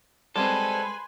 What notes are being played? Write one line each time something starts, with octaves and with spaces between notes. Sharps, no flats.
G3 G#3 C4 A4 B4 G#5 C6